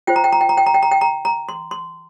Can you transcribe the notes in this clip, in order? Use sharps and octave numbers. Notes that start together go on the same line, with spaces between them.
F4 C5 G5
A#5
G5
A#5
G5
A#5
G5
A#5
G5
A#5
G5
A#5
A#5
C6
C6